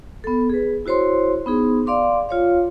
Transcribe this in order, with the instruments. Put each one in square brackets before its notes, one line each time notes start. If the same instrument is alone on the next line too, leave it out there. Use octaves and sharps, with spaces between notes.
[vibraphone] B3 A4
G#4 B4
E4 F#4 C5 C#5 C6
B3 D#4 G#4
D5 F5 C6 D6
F4 C#5 F5